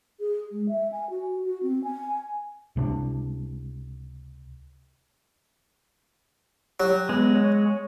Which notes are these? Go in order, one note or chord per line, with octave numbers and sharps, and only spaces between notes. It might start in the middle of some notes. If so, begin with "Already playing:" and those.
G#4
G#3
E5
G#5
F#4
F#4
C4
G#5
C#2 C3 D#3 D4
F#3 G4
G#3 B3
C#5